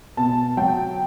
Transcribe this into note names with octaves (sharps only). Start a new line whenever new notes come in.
B2 A5
F#3 G5